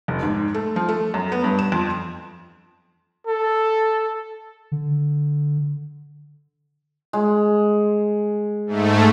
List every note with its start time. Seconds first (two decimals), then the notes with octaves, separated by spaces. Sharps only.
0.08 F1
0.23 G#2
0.54 A3
0.76 F3
0.89 A3
1.14 F#2
1.32 B3
1.44 G2
1.59 E7
1.72 F2
3.27 A4
4.72 D3
7.13 G#3
8.66 G#2 A3